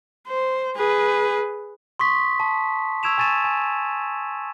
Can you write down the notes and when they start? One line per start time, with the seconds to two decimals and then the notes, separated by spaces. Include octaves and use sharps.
0.28 C5
0.76 G#4 B4
1.99 C6 C#6 D#6 B6
2.40 A5
3.03 C#6 E6 G#6 D7 E7 F7
3.18 G#5 C#6 A6 D#7 E7
3.44 G#5